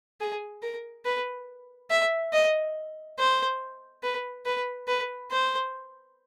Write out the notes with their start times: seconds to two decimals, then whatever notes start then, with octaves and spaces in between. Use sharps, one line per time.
0.21 G#4
0.63 A#4
1.05 B4
1.90 E5
2.33 D#5
3.19 C5
4.03 B4
4.46 B4
4.88 B4
5.31 C5